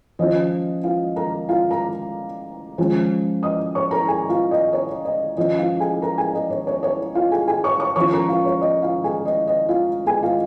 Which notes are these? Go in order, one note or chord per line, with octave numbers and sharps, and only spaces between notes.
F3 C#4 F4 D#5
F4 F5
A#4 A#5
F4 F5
A#4 A#5
F3 G#3 C#4 F4
D#5 D#6
C#5 C#6
A#4 A#5
G#4 G#5
F4 F5
D#5
C#5
D#5
F3 C#4 F4 D#5
F4 F5
G#4 G#5
A#4 A#5
G#4 G#5
D#5
C#5
C#5
C#5
F4 F5
G#4 G#5
G#4 G#5
C#5 C#6
C#5 C#6
F3 C#4 F4 C#5 C#6
A#4 A#5
F4 F5
C#5
D#5
F4 F5
G#4 G#5
D#5
D#5
F4 F5
G#4 G#5
F4 F5